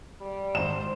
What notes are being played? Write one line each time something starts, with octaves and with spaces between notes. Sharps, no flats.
G3
G#1 C5 E7